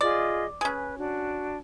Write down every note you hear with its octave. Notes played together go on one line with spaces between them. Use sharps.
F4 G#4 D5 D#5
C#4 G#4 B4
D4 F#4